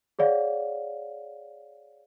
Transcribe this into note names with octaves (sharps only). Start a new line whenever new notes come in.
G#4 C#5 D5 F5 F#5